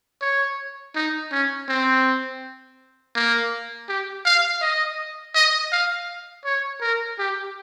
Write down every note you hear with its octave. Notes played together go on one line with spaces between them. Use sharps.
C#5
D#4
C#4
C4
A#3
G4
F5
D#5
D#5
F5
C#5
A#4
G4